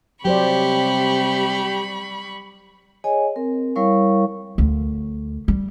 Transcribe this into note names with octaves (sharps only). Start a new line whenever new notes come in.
C3 F#3 G3 G4 C5 D5 B5 C#6
G#4 C#5 D#5 G#5
C4 A#4
G3 E4 A#4 C#5 F5 C#6
D2
G3